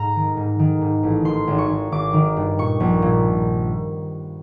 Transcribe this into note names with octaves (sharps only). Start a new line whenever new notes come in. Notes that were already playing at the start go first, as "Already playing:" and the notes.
Already playing: G#2 A#5
D#3
G#2
D#3
G#2
A1
D#3 C6
G#1
C#6
G#1
G#1 D6
D#3
G2
A#2 C#6
A#1
A#2